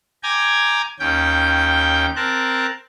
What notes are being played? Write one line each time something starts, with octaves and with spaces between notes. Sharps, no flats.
G5 G#5 A#5 D6 G#6
D#2 C#4 G5 G6
C4 A#4 A5 F#6